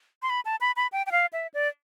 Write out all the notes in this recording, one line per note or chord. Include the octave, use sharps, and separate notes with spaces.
C6
B5
A5
B5
B5
G5
G5
F5
E5
D5